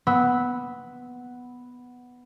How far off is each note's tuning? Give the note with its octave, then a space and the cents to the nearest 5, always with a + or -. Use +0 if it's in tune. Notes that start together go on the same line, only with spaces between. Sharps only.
B3 +0 E6 -20